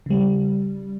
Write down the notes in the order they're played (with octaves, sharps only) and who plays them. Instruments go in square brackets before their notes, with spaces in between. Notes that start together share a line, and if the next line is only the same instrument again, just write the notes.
[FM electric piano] C#3 G3